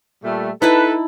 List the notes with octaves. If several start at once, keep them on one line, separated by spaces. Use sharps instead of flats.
A#2 G3 A3
D#4 E4 A4 B4 A5